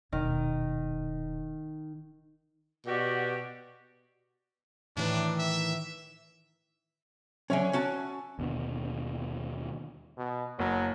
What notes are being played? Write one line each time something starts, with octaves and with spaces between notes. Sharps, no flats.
D#1 B2 D#3
B2 F#4 G4 D5
A2 D#3 E3 D4
E5
D3 F#3 C#4 C#5 E5 G#5
C#4 F#4 A5
D#2 B2 D3
B2
F#1 F#3